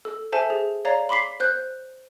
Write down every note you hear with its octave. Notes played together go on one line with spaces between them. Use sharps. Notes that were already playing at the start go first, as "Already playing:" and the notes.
A4
A4 C5 E5 G#5 A5
G#4
C#5 D5 F5 A#5
B5 C6 D6 B6 C7
C5 F#6 G6